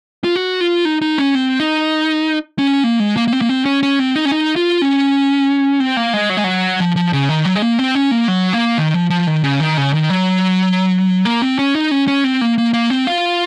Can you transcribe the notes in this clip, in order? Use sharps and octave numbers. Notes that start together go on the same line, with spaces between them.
F4
F#4
F4
D#4
D#4
C#4
C4
D#4
C#4
A#3
G#3
A#3
A#3
C4
A#3
C4
C#4
C#4
C4
D#4
C#4
D#4
F4
C#4
C4
A#3
G#3
F#3
G#3
F#3
F3
F3
C#3
D#3
F#3
G#3
A#3
C4
C#4
A#3
F#3
A#3
D#3
F3
F3
D#3
C#3
D#3
C#3
D#3
F#3
A#3
C4
C#4
D#4
C#4
C#4
C4
A#3
A#3
A#3
C4
F4